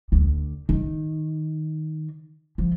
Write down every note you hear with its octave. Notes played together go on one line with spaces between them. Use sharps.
D2
D#3
F3